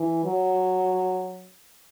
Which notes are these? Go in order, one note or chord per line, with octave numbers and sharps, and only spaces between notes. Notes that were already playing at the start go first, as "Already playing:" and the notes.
Already playing: E3
F#3